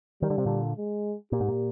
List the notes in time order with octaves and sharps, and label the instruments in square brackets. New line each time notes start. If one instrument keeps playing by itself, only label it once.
[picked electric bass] D#3 [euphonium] G3
[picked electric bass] D3
C3
A#2 D3
[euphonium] G#3
[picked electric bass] A#2 [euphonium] G4
[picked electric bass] G#2
A#2